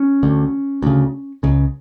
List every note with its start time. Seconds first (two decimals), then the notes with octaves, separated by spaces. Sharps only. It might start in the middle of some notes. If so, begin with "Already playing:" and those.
Already playing: C#4
0.23 D2 D3
0.83 D2 C#3
1.43 C#2 C#3